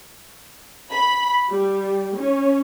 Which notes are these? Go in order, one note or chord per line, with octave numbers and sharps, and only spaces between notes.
B5
G3
C#4